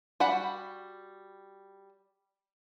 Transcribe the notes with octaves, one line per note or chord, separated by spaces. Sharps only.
G3 F#4 F#5 B5